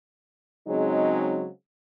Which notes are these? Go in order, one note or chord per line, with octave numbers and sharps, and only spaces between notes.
C#3 F#3 G#3 C4 D#4